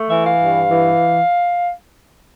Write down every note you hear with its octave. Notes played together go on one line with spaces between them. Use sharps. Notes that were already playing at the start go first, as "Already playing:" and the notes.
Already playing: A3
E3 E5
F5
G2
E3